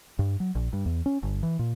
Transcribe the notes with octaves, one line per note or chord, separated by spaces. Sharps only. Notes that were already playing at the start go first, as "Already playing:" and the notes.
G2
F#3
A#1
G2
E2
C#4
G1
E3
A#2